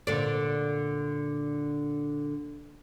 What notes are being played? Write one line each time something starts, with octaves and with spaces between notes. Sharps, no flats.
A#2 D3 D5